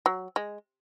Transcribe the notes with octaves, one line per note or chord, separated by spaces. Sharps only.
F#3
G#3